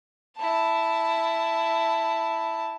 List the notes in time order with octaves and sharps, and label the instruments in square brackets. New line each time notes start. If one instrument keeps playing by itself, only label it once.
[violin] E4 A5